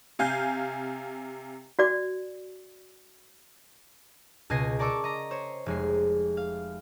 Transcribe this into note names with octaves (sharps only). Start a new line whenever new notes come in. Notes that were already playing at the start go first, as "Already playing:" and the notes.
C3 F5 G#5 G6
F#4 D5 D6
C#2 B2 D#5 G#5 A#6 C7
A#4 D5 A5 C#6 D6 E6
D#5 A#5
C5 C#5
F1 G#3 C7
F5